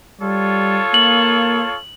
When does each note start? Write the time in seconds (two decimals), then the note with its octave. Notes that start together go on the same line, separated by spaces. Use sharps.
0.21 G3 F4 A4 C#5
0.94 A#3 F#7